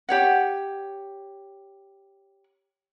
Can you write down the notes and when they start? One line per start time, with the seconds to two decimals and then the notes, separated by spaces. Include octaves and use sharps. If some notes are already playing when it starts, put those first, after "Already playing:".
0.09 G4 C#5 F#5